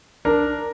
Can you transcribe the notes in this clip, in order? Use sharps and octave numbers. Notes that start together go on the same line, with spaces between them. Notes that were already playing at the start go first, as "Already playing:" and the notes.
D4 A#4